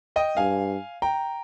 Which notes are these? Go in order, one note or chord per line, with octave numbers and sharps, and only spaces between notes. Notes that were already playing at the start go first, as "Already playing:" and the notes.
D#5 G5
G2 F5 G#5
G5 A#5